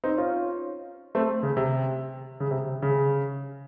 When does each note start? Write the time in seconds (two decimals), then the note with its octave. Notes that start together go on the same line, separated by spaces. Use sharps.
0.04 C4 D#4
0.18 C#4 F4
1.15 A3 C4
1.43 C#3
1.57 C3
2.40 C#3
2.51 C3
2.82 C#3